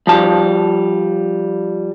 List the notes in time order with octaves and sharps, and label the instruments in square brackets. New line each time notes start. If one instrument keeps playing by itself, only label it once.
[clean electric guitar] F3 G3 A5